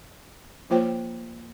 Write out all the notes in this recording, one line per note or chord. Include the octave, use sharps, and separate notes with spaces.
F3 A#3 F4 C5 C#5 G5